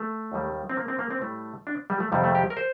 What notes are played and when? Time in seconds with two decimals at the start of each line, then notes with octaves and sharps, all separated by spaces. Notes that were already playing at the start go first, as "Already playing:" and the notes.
Already playing: A3
0.32 D#2 D#3 G3
0.70 C4
0.77 A#3
0.88 C4
0.99 A#3
1.11 C4
1.21 A2 G3 A3
1.67 D4
1.90 G3
2.00 A3
2.12 F2 C3 D#3 G3
2.24 A3
2.35 G4
2.50 A#4
2.57 C5